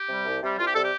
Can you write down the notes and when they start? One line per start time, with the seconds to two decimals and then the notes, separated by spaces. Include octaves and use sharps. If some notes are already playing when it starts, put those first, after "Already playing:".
Already playing: G4
0.09 C3 G3
0.26 C2
0.42 C3 G3
0.58 C2 F4
0.66 G4
0.74 C3 G3 A4
0.83 G4